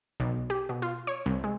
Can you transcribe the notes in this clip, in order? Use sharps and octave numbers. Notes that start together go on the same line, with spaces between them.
B1
G4
B2
F4
C#5
C2
G#3